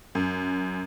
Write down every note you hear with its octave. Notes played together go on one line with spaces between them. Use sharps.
F#2